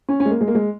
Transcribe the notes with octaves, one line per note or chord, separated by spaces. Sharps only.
C#4
C#4
G#3
A#3
G#3
A#3
G#3